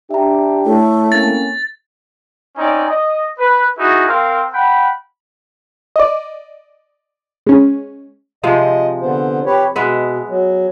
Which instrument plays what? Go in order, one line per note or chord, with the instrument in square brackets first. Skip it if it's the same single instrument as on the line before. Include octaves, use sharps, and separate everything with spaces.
[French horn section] D4 G4 [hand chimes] E5 A#5
[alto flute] A3 [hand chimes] E4 A4 C#5
[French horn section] A#3 C4 C#4 [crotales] A6
[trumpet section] C4 C#4 D#4 D5
D#5
B4
D#4 E4 F#4 G#4
C4 A#4 F5 C6
F#5 G5 B5
[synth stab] D5 D#5
G#3 C#4
[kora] C3 F3 G#3 [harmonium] D#5
[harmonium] D3 B3 C5
G4 B4 C#5
[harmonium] B2 [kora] G#3 B3 E5
[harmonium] F#3